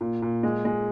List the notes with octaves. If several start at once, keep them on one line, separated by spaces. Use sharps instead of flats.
A#2
A#2
G#3
G#3